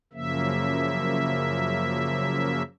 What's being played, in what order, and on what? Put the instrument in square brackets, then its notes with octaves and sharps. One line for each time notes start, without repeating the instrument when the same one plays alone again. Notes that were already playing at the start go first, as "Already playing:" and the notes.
[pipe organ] F#2 C#3 F3 A#3 E5